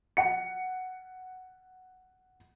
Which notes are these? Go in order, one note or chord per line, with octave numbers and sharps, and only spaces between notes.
F#5 C#7